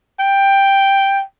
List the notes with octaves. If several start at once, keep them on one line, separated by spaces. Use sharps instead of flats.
G5